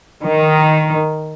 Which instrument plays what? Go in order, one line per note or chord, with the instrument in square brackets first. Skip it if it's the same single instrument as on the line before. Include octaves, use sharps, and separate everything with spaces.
[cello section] D#3